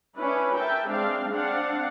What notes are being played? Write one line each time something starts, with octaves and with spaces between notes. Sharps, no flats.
C#4 D4 E4 B4
A#4 E5 G5 A5
G#3 C4 D4 F5
C4 D4 F5 F#5